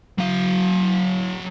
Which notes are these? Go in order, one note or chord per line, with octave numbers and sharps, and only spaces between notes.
F#3 F5